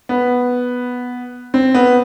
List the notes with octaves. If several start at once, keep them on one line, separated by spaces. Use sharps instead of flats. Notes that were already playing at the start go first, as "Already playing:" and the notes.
B3
C4
B3